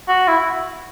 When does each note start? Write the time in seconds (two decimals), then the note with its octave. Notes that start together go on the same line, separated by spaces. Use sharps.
0.08 F#4
0.28 E4